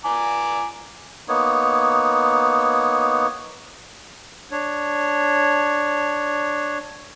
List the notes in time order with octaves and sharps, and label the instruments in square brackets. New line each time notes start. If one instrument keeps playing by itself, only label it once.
[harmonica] G#5 A#5 D6
[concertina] A#3 B3 D#4 C#5
[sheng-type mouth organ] D4 C#5